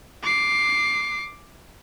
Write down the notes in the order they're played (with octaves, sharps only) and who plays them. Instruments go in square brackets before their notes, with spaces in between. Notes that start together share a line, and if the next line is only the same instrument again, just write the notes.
[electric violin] D6 C7